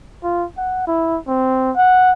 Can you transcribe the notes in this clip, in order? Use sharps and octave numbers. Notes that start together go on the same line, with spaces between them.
F4
F#5
E4
C4
F#5